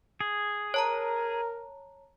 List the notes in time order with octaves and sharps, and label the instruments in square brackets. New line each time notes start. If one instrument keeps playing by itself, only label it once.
[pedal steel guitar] G#4
[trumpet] A#4 [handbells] C#5 A5 A#5